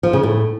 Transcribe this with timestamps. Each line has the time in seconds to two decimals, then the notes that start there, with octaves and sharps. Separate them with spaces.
0.03 F3
0.13 C#3
0.23 A2